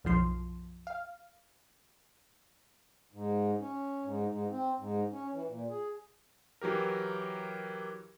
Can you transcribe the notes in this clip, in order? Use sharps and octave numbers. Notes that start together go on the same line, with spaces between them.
B1 F#2 F3 C6
F5
G#2
C#4
G#2
G#2
C4
G#2
C#4
E3
A#2
G#4
E3 F#3 G4 A#4